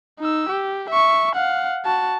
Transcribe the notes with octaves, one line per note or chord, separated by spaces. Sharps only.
D#4 E6
G4
E5 C#6
F5 F#5
F#4 A5